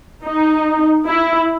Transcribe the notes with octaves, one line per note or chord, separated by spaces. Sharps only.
D#4
E4